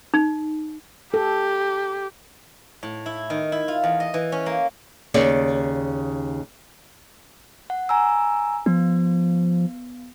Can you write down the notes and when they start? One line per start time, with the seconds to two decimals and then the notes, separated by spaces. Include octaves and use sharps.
0.14 D#4
1.14 G4 A4
2.83 A2
3.06 E4
3.30 D#3
3.52 E4
3.68 F4
3.84 E2
4.00 D#5
4.14 E3
4.32 C#4
4.46 A#3
5.14 D#2 C#3 D5
7.70 F#5
7.89 G#5 A#5 E6
8.66 F3 B3